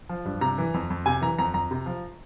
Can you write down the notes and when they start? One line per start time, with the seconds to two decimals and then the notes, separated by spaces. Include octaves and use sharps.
0.09 F3
0.25 G2
0.41 C3 A#5
0.58 E3
0.74 F2
0.90 F2
1.06 C3 G#5
1.21 E3 A#5
1.38 F2 A#5
1.54 F2 A#5
1.71 C3
1.86 F3